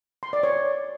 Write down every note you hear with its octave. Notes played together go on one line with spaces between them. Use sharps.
C6
D5
C#5